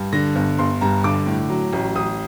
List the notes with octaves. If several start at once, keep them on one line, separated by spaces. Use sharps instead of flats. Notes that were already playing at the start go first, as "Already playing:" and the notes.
Already playing: G2
D3 A#6
G1
G1 C6
G2 A#5
D3 D6
A2
F#3
A1
A1 D#6